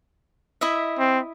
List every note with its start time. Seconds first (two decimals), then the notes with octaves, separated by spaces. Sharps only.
0.61 E4 D#5 E5
0.99 C4